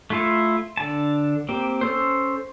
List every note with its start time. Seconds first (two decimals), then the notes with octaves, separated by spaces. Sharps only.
0.10 A3 E4 F4 A4
0.77 D3 A5
1.49 A#3 C4 G4
1.81 C#4 A4 C5